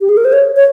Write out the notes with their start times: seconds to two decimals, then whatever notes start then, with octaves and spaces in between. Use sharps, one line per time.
0.01 G4
0.09 G#4
0.17 A#4
0.25 C5
0.32 C#5
0.56 C#5